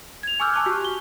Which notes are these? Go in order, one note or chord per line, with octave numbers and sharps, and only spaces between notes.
G#6 F7
G#5 C#6 D6 E6 F6 G6
G#5 A5 C#6 D6 F#6
F#4 G4
G7